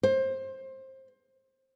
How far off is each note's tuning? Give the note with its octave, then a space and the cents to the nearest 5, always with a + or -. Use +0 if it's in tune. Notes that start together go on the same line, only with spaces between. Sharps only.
C5 +20